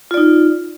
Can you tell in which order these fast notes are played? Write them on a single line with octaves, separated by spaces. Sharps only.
F4 D5 D#4